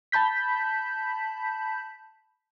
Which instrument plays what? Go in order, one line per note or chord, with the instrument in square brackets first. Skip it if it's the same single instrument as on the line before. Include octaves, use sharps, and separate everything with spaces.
[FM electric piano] A5 B5 G6 B6